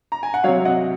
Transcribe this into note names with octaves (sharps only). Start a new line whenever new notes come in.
A#5
G#5
F#5
C3 F#3 C#5 F5
D#5 F#5